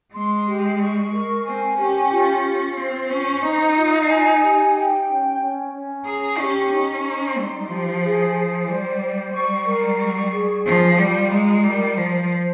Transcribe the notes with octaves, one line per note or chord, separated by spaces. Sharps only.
G#3 C6
G4
C#6
A#4
C4 G#5
C#4 G4
F4
F4
C4 C5
C#4 C5
D#4 A#5
F4
G#5
G4
G5
C#4
C#4
C#4
G#4 A#5
C#4 G4
C#4 D#4
D#4
G3 C6
F3 G4
G#4
G#4
G3 C5
C5
G3 C#6
A#4
C#6
G#4
F3 F4
G3 F4
G#3 A#5
G3 A#4
F3 C5
C5